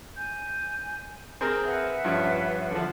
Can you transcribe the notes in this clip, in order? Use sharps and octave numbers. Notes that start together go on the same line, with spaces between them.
G#5 G6
C4 G#4 A#4 C5
B4 E5 F#5
G2 F3 C#4
D3 F3